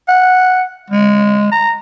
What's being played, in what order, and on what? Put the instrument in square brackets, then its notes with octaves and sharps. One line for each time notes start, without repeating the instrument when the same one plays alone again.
[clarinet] F#5
G#3
A#5